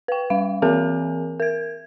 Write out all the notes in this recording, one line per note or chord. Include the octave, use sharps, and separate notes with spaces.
B4 G5
G3 F5
E3 C4 G#4 A#4 G#5
A#4 G#6